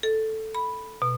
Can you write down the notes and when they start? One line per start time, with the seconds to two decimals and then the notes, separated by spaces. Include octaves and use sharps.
0.03 A4
0.55 B5
1.02 B2